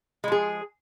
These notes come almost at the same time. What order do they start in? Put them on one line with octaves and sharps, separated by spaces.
G#3 F3 G#4